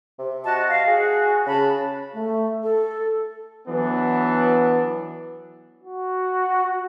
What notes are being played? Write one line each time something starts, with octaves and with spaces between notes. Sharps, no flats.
C3
F#4 D#5 A5
D#5 F5
F#4 G#4
C#3 A5 B5
A3
A4
E3 F#3 B3 D4
F#4